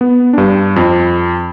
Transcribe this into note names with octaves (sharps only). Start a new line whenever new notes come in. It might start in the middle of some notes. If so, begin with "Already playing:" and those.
B3
G2 D4
F2